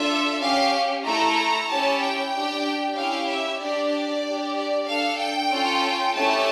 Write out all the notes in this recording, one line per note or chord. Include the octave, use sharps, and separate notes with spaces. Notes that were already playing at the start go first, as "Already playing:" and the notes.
Already playing: D4 F4 A4 E5
C#4 G4 F5
A3 E4 A4 A#5
C#4 E4 G4 A5
G5
D4 G4
C#4 E4 G4 F5
E5
D4 G4 D5
D5
D4 G4
D5
D4 A4 F5
G5
C#4 F4 A4
A3 C#4 E4 G4 A5